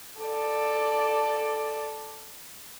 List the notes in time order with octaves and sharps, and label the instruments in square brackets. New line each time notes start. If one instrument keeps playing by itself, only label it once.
[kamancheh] A4 D5